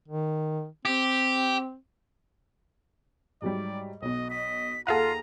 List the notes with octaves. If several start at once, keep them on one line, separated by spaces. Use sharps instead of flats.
D#3
C4 G4
G#2 F#3 G3 D5
B1 B2 D#5
D#5 B6
D#2 F4 G#4 A4 F5 F#5 A#5 D#7